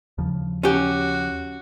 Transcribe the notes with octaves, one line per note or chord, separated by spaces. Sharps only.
D#2 C#3 F3
C#4 F#4 G4